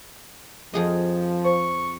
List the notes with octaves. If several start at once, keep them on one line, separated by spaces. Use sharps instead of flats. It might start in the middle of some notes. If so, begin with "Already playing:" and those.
F2 F3 G#4 D#5
C5 C#6